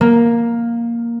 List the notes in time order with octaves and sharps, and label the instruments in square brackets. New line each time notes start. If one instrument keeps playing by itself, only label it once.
[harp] A#3